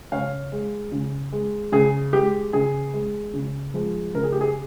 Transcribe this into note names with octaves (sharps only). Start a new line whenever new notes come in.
C#3 C#5 F5
G#3
C#3
G#3
C#3 G#4
G#3 G4
C#3 G#4
G#3
C#3
F3 G#3
C#3 A#4
G#4
G4
G#4